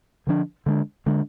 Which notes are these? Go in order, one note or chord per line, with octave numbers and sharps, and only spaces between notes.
D3 F3 A3 D4
D3 G#3 D4
D3 G#3 D4